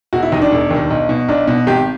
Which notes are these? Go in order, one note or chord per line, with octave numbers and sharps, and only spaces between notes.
E1 F#4
E4
D#2 D#3 D#4
D4
E1
D#2 D#3
B1
B2
B1 D4
B2
G#1 G4